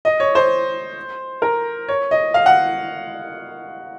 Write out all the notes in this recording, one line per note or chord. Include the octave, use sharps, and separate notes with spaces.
D#5
C#5
C5
A#4
C#5
D#5
F5
F#5